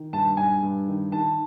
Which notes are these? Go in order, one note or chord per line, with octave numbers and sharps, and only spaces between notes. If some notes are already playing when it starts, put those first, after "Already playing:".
Already playing: D#3
G2 A5
G2 G#5
G2
D#3
D#3 A5